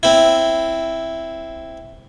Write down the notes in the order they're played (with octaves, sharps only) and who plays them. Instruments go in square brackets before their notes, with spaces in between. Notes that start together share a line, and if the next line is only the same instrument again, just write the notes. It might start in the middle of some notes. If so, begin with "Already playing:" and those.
[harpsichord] C4 E4